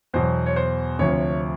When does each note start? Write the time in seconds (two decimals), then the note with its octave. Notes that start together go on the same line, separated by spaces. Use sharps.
0.14 E2 B2 F#3 C5
0.46 C#5
0.56 C5
0.99 D2 C3 F3 C#5